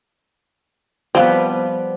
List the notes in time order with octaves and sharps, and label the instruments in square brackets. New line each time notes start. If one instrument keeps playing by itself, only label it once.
[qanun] F3 G3 B3 [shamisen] C4 F5